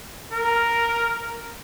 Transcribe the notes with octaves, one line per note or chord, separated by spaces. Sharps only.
A#4